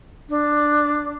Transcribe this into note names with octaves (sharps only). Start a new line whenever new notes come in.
D4